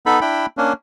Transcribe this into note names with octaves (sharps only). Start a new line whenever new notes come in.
B3 D#4 A4 B5
D4 E4 G5 B5
A#3 C#4 D4